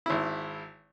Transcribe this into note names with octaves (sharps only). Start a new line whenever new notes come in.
G#1 E4